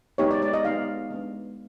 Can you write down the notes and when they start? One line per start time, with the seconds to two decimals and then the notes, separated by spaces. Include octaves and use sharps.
0.18 G#3 B3 D#4 G4 C#5
0.31 D5
0.42 D5
0.53 D#5
0.64 G#3 B3 D#4 G4 F5
1.10 G#3 B3 D4